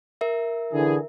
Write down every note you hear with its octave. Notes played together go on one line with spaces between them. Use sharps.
A#4 E5
D3 E3 G#4